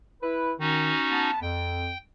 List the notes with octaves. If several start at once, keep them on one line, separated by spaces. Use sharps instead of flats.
E4 B4
D#3 C#4 D#4 F#4
B3 A5
F2 G5